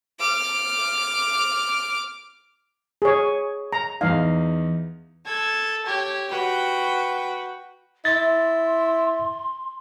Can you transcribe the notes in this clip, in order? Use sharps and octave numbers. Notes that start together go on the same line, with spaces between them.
D6 F6
G#4 C#5
A#5
E2 D#4 F5
A4 G#6
G4 C#5 G#6
F#4 B4 G5
E4 C6 A6